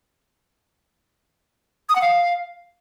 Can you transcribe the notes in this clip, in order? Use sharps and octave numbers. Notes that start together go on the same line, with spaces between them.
D#6
F#5
F5